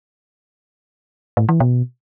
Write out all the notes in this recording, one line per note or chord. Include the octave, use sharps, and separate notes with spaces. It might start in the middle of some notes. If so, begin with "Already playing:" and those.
A2
E3
B2